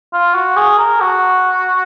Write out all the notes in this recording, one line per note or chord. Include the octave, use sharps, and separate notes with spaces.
F4
F#4
G#4
A#4
F#4